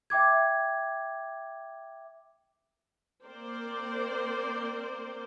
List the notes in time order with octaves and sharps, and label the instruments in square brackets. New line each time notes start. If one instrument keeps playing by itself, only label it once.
[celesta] E5 G5 D6 G#6
[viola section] A#3 C4 A#4 C5 D5